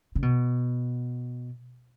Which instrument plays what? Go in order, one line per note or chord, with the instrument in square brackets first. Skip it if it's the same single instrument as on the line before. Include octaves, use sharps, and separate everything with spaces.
[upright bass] C#3
B2